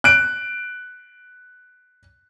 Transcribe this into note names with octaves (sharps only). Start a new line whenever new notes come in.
F#6 D7